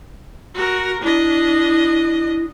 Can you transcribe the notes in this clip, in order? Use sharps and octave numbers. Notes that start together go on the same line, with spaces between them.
F#4 A#4
D4 E4 D#5